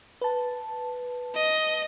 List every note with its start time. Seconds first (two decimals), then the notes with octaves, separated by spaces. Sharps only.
0.21 B4 A5
1.35 D#5